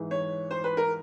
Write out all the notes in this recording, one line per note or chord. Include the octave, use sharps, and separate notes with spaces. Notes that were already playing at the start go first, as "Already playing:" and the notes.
Already playing: G#2 E3
C#5
C5
B4
A#4